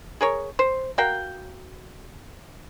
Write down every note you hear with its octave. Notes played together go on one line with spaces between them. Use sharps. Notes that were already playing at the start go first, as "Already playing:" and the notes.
G#4 A#4 C#5
C5
F#4 A#4 F5 G5